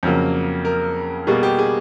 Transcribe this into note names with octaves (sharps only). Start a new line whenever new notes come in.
F2 C#3 F#3 A#3
A#4
B2 G3 A#3 G#4
G4
G#4